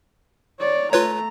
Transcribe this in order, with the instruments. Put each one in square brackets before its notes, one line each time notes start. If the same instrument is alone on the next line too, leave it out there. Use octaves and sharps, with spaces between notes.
[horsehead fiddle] C#5 D5
[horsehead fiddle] A3 A#5 [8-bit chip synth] F4 B4 C#5